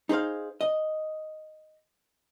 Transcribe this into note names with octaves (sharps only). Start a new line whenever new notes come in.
D#4 G#4 C5 F5
D#5